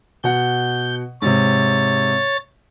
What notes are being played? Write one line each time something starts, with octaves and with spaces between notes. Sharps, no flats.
B2 F#5 G6
G#2 C3 C#5 A6